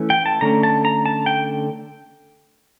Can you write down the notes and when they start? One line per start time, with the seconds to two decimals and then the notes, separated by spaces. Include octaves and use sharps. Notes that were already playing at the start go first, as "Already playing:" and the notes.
Already playing: E3 A3 C#4
0.10 G5
0.26 A5
0.41 D3 A3 C#4 A#5
0.63 A5
0.85 A#5
1.06 A5
1.26 G5